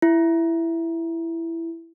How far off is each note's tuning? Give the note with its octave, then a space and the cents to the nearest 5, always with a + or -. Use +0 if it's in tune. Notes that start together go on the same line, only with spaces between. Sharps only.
E4 +10